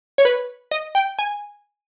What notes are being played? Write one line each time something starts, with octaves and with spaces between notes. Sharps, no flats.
C#5
B4
D#5
G5
G#5